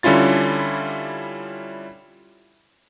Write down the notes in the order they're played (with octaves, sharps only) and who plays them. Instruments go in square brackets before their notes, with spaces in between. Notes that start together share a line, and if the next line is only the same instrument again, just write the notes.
[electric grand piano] D3 G3 C#4 E4 F4 A6